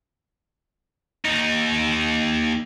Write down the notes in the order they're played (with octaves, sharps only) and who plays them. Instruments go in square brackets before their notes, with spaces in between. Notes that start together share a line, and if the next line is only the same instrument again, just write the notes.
[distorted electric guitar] D#2 D#4